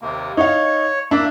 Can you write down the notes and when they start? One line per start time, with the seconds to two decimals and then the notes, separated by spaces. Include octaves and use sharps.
0.02 D#2 C3 A#3
0.37 D#4 C#5 F5
1.11 A#3 D4 E5